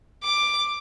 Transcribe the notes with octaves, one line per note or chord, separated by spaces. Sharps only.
D6